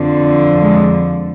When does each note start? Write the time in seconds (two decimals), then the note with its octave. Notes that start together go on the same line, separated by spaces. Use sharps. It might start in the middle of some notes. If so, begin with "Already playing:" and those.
Already playing: F2 D3 F3
0.60 G#3